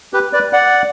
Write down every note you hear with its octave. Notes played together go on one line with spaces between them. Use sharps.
G4 B4
B4 D5
D5 F#5